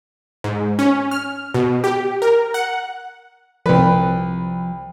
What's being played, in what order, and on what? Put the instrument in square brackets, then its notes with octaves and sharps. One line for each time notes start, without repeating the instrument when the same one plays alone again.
[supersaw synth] G#2
C#4
F6
B2
G4
A#4
F#5
[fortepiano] C2 B4 [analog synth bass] F3